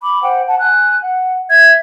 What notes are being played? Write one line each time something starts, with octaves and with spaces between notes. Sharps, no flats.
B5 D6
C5 F#5 G5
F#5 A5
G#5 F#6
F#5
E5 G#6